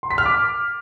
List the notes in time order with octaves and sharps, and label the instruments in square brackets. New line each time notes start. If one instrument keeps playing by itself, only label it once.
[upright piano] C6
B6
F6
D6